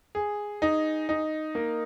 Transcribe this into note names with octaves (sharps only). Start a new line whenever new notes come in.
G#4
D#4
D#4
A#3